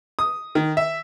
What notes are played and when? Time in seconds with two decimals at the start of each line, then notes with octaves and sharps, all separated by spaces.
0.19 D#6
0.55 D#3
0.77 E5